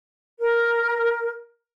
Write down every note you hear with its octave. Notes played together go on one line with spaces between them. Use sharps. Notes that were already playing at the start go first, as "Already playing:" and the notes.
A#4